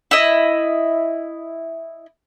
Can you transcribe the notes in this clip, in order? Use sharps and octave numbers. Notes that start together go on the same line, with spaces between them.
E4 D#5